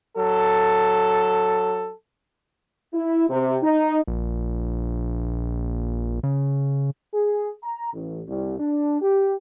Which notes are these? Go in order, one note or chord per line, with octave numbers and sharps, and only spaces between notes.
F#3 A4
E4
C3
D#4
A#1
C#3
G#4
A#5
A1
C2
D4
G4